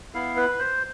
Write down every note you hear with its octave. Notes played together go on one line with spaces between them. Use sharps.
B3 E4 F5
B4
C5